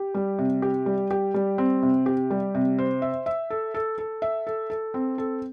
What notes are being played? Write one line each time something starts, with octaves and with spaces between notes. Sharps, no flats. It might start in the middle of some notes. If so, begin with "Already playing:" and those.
Already playing: G4
G3
C3
G4
G3
G4
G3
C4
C3
G4
G3
C3
C5
E5
E5
A4
A4
A4
E5
A4
A4
C4
A4